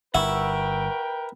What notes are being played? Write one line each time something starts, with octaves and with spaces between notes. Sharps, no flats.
G1 E4 A#4 B4 F#5 G5 C#6 E6